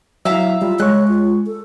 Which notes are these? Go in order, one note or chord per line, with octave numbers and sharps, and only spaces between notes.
F#3 E4 E5 F5 A#5
G3 F4
G#3 C#5 C#6 F#6
F4
A4